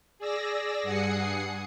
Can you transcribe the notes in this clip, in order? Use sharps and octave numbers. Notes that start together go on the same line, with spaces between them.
G#4 D5 E6 A#6
G2 F#5 G#5 D#6 C7 C#7